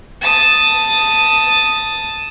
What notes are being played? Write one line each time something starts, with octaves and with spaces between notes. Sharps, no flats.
A5 D#6